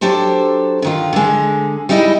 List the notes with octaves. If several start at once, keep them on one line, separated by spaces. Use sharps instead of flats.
F#3 D4 G4 A4 C5
D3 D#3 F4
D3 G#3
G3 G#3 D#4 E4 D#5